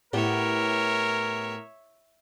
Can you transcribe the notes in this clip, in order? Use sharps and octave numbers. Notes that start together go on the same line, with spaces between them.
A2 B3 G4 A#4 C#5 E5